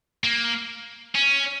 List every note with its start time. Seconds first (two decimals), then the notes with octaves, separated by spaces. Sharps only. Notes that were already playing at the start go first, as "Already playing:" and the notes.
0.24 A#3
1.15 C#4